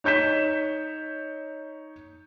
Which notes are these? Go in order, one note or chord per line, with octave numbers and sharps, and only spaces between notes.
D#4 C#5 G6 B6 E7